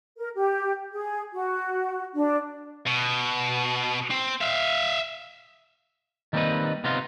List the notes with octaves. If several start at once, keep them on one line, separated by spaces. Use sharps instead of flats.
A#4
G4
G#4
F#4
D4
B2
C4
E5 F5
D#3 G3 A#3 C4 D#4 B4
C3 B3 C4 D#4 F4